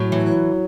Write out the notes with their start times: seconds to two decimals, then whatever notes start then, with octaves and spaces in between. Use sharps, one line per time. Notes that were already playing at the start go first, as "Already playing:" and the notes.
Already playing: A2 F#3
0.12 E3